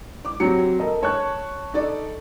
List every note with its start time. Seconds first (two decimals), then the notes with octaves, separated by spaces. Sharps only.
0.25 D6
0.40 F#3 C4 G4 C#7
0.79 A4 A#4 D#5
1.03 C#5 A5 C#6 F#6
1.74 D#4 A4 D5